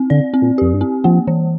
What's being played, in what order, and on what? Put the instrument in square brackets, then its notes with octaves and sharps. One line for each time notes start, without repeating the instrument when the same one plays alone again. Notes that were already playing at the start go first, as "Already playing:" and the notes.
Already playing: [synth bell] C4
[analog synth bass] D3 [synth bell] D5
[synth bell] C4
[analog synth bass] A#2
[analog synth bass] F2 [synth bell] G4
[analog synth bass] G2
[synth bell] C4
[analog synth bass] F3 [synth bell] A#3
[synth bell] E3